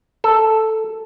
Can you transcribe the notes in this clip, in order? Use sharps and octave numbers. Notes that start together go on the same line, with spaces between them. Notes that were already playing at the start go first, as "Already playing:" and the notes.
A4